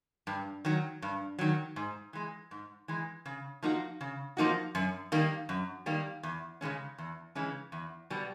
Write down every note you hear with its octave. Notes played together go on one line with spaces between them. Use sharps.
G2
D#3 F#3
G2
D#3 F#3
G#2
E3 G#3
G#2
E3 G#3
C#3
F3 A#3 D#4 F#4
C#3
F3 A#3 D#4 F#4
F#2
D#3 G3 A#3
F#2
D#3 G3 A#3
E2
C#3 E3 G#3 C#4
E2
C#3 E3 G#3 C#4
E2
B2 G3 B3